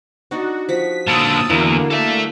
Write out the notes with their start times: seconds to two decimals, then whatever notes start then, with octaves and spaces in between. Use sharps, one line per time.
0.31 D4 D#4 F#4
0.69 F3 F#4 B6
1.07 A#2 D3 A5 D#6 E6
1.50 E2 D3 A#3 E4 F#4
1.90 A4 E5